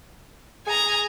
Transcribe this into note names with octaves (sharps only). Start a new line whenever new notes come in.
G#4 G#5 A#5